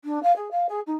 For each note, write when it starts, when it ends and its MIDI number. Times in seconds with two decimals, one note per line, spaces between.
0.04 0.21 62
0.22 0.34 77
0.35 0.48 68
0.51 0.66 77
0.68 0.79 68
0.86 0.95 63